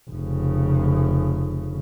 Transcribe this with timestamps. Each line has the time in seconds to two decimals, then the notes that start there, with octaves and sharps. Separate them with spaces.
0.11 F1 C#3